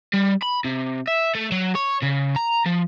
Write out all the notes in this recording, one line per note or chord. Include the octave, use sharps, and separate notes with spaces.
G3
B5
C3
E5
A3
F#3
C#5
C#3
A#5
F3